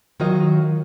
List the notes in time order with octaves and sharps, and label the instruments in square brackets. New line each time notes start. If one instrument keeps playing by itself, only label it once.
[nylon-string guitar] D#3 F#3 F4 D#5